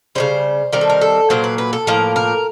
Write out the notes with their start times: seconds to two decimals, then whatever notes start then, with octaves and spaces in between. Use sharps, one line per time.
0.15 C#3 E3 G3 C5
0.73 D#3 G3 C4 A#4
0.81 A4
0.90 A#4
1.01 A4
1.30 A#2 F#3 A#3 C5
1.44 B4
1.58 B4
1.73 A4
1.87 A2 F3 A#3 A#4
2.16 A#4